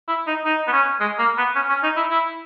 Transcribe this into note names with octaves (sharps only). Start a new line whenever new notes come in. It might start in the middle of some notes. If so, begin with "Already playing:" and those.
E4
D#4
D#4
B3
C#4
G#3
A#3
B3
C#4
C#4
D#4
E4
E4